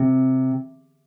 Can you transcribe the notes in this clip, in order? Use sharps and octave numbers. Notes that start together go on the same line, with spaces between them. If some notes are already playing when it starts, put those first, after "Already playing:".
Already playing: C3